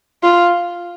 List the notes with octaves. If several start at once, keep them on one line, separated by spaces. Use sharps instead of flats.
F4